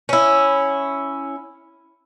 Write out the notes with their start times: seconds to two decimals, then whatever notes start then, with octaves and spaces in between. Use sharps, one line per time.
0.09 C#4 E4